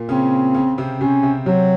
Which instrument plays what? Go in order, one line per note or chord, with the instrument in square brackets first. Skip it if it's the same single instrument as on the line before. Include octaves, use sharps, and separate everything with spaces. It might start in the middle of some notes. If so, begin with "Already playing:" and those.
Already playing: [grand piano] A#2 A#3
[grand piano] C#3 C#4 [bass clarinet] C4
[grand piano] C#3 C#4
C3 C4
[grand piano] C3 C4 [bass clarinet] C#4
[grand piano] C3 C4
[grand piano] C3 C4 [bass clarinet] F#3